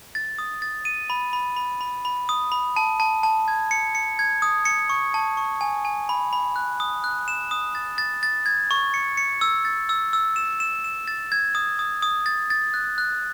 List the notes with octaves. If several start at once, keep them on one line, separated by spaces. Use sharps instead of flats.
A6
D#6
A6
D#7
B5
B5
B5
B5
B5
D#6
B5
A5
A5
A5
G#6
C#7
C#7
G#6
D#6
C#7
C#6
A5
C#6
G#5
G#5
B5
B5
F#6
D#6
F#6
E7
D#6
A6
A6
A6
G#6
C#6
C#7
C#7
E6
A6
E6
E6
E7
E7
E7
A6
G#6
D#6
D#6
D#6
A6
A6
F#6
F#6